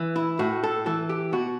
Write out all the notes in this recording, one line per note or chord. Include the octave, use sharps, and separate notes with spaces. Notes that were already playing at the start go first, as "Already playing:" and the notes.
Already playing: E3
E4
A2 F#4
A4
E3 A4
G4
B2 F#4